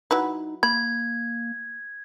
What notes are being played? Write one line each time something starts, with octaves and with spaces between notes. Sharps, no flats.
F#3 D#4 E4 B4
A#3 B5 G#6